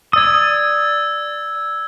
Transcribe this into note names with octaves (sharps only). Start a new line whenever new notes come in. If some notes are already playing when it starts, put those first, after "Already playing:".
D5 D#6 E6 G#6